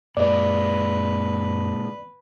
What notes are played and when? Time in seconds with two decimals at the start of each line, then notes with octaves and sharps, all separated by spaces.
0.17 F#2 A#2 G#3 B4 D5